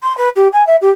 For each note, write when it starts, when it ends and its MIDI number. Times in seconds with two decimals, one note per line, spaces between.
0.03 0.15 84
0.17 0.29 71
0.36 0.48 67
0.52 0.65 80
0.67 0.76 76
0.81 0.89 67